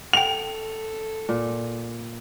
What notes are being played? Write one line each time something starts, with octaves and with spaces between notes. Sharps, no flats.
A4 F#5 G5 F7
A#2